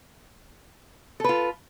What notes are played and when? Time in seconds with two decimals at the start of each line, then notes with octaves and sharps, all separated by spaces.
1.20 A4
1.24 B4
1.29 F4